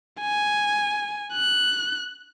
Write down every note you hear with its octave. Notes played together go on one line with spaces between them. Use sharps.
G#5
F#6